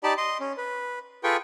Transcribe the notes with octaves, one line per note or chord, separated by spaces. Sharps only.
D#4 G4 D5 A5 B5
D#5 C6
C#4
B4
F4 G#4 A4 B4 G5 C#6